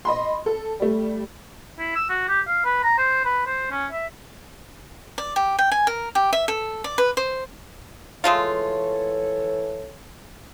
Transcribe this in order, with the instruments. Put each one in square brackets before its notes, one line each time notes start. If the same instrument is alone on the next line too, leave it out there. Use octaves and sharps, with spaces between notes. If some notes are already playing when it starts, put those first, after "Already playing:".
[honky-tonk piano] D#5 B5 C6
A4
G3 A3
[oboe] E4
E6
F#4
G4
F5
B4
A#5
C5
B4
C5
C#4
E5
[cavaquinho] D5
G4
G5
G#5
A#4
G4
E5
A4
D5
B4
C5
[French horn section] E3 A4 C#5 [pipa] G#3 A3 F4